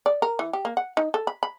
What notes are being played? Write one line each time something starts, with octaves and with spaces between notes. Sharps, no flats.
D5
A#4
E3
G4
A#3
F#5
D#4
A4
B5
B5